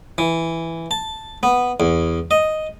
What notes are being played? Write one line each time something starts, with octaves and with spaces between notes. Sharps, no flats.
E3
A5
B3
E2
D#5